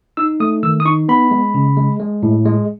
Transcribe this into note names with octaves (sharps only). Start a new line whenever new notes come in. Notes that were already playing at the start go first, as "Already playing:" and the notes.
D#4 E6
A3 D#6
D#3 E6
D#6
D#4 C#6
B3 B5
G#3
C#3
G#3
G#3
A2
G#3